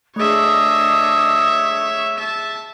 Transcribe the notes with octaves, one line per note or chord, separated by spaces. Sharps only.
A3 D4 G#4 C#5 D#5 E5 D#6
E5 A5